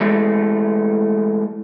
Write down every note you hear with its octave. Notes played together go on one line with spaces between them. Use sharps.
E3 G#3 A3